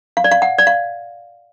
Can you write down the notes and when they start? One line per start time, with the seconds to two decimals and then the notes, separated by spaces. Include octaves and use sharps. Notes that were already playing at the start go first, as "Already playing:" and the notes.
0.17 F5
0.24 D5
0.31 F5
0.42 F#5
0.58 D5
0.67 F5